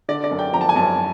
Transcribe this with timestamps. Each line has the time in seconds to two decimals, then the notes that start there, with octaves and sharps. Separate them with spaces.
0.08 D3 D5
0.24 D5
0.31 F#2
0.39 G5
0.53 F3 A#5
0.61 A5
0.69 G#5
0.76 F#2 A5